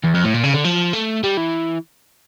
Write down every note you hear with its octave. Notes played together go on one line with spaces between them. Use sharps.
E2
F2
A2
A#2
C#3
D3
F3
A3
G3
E3